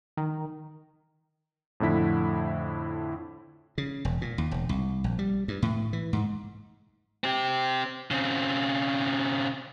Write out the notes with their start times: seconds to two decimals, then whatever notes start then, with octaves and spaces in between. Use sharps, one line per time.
0.17 D#3
1.80 F2 A2 D3 E4 B6
3.78 C#3
4.05 E1
4.21 A#2
4.38 D#2
4.51 E1
4.69 C2
5.04 A#1
5.19 G3
5.48 G2
5.62 A2
5.93 E3
6.13 G#2
7.24 C4 G4
8.11 C#3 C4